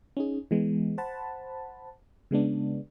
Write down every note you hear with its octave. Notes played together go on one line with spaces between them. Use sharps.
C#4 D#4 G#4
E3 G#3 B3
C5 F#5 A5 B5
C#3 G#3 B3 D4